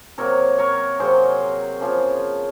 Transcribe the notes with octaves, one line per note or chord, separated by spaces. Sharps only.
C3 F#3 A#3 A#4 C#5
A#4 C#5
C3 F#3 A#3 G#4 C5
C#3 F3 A#3 C#4